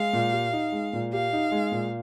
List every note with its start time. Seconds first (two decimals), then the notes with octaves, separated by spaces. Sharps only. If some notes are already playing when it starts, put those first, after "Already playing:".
Already playing: G#3 F5
0.13 A#2
0.33 G4
0.53 D#4
0.72 G#3
0.93 A#2
1.13 G4 F5
1.33 D#4
1.52 G#3
1.72 A#2